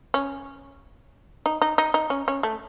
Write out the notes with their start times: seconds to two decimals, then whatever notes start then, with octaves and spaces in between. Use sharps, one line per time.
0.14 C#4
1.46 D#4
1.62 D#4
1.78 D#4
1.94 D#4
2.10 C#4
2.28 C#4
2.43 A3